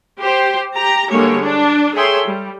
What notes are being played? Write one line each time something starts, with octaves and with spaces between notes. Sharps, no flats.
G4 C5
G4 A#5
D3 G3 G#3 A#3 C#5
D4
G#4 A4 C#5 E5 G5 C6
G3